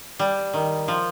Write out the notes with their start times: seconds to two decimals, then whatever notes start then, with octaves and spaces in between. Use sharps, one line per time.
0.19 G3
0.54 D#3
0.88 F3